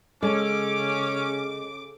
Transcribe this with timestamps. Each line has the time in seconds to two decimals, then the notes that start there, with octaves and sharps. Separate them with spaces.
0.23 C#3 G#3 C#4 A4 D6